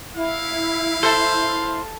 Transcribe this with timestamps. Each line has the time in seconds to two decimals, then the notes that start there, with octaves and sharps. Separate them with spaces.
0.16 E4 F5
1.03 A4 C5